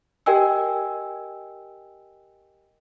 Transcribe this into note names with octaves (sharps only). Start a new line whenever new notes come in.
G4 A#4 D#5 G5 G#5 E6